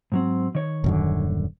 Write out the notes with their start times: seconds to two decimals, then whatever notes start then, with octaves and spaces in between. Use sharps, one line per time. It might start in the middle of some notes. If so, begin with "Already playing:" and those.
0.12 G#2 F#3 C4
0.55 D#3 C#5
0.84 D#1 F#2 D3